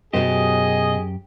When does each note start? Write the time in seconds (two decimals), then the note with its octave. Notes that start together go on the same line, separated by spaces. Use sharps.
0.13 F#2 B2 B3 G4 G#4 C5 D#5